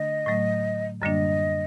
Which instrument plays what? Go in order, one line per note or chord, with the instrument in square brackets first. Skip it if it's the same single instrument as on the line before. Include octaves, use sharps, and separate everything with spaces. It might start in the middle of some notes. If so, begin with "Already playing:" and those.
Already playing: [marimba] D3 A3 D4 [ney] D#5
[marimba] A2 F#3 A3
[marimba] F#2 D3 G3 A#3 D4 [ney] D#5